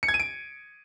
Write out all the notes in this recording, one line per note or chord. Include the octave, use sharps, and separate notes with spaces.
C#7
G#6
D#7
D7